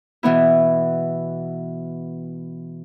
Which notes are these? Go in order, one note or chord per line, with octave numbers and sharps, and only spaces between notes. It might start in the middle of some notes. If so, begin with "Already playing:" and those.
B2 E3 B3 E4